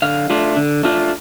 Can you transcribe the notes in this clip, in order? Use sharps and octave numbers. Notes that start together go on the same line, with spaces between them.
D3 F5
A3 D4 F4
D3
A3 D4 F4